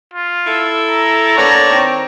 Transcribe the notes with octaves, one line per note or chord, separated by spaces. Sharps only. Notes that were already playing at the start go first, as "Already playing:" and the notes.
F4
E4 A4
A#5
A#3 B3 D4 A4 C#5
D#3 C4